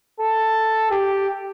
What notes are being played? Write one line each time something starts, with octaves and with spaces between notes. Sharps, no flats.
A4
G4